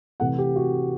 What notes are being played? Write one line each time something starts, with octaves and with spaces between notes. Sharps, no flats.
C3 E3 A3 F#5
G4
F#4